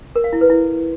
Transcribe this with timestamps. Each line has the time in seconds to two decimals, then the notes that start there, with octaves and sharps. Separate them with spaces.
0.16 A#4
0.24 F5
0.33 E4
0.41 B4
0.50 E4